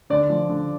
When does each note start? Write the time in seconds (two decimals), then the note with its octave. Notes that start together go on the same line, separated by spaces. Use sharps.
0.10 D3 D5
0.30 F3
0.49 D3